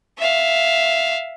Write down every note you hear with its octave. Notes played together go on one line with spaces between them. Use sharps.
E5 F5